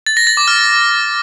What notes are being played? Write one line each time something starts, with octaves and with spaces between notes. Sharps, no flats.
A6
A#6
A6
D6
F6